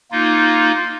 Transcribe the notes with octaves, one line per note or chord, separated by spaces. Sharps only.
A#3 D#4 F4